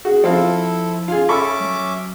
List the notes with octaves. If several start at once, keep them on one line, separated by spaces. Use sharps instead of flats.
F#4 G#4
F3 C4 E4 F4 A4
F4 G#4 F6
C#4 A4 E5 B5 C#6 D6
F#3